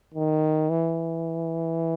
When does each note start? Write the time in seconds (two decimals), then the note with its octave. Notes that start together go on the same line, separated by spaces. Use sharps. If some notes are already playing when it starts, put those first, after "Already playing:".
0.14 D#3
0.70 E3